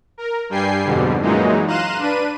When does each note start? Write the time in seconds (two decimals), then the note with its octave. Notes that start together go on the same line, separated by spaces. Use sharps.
0.18 A#4
0.49 G2 G3 G5 G#5 C7
0.83 F2 G#2 B2 D3 G3
1.21 F#2 A#2 E3 F#3 G#3 D#4
1.67 F5 A#5 C6 F#6 D#7 E7
1.99 D4 B4 D#7